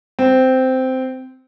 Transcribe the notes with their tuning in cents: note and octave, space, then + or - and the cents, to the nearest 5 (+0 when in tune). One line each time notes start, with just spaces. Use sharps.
C4 -10